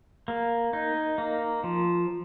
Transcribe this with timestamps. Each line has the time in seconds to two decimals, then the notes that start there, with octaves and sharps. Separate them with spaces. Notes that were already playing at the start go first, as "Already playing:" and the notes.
0.28 A#3
0.73 D#4
1.18 A#3
1.64 F3